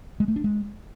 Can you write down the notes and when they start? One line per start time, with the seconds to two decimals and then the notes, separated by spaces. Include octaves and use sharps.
0.20 G#3
0.28 A3
0.36 D4
0.44 G#3